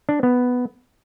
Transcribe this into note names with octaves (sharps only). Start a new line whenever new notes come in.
D4
B3